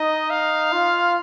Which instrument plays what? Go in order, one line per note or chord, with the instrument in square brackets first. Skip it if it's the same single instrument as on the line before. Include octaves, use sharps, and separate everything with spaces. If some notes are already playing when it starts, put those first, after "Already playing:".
Already playing: [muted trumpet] D#4 [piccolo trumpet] D#5
[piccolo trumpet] F5
[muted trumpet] F4